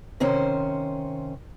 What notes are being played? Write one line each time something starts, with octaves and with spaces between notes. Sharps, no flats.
C3 D#3 C#4 C5